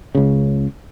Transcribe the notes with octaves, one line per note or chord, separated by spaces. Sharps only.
C#2 C#3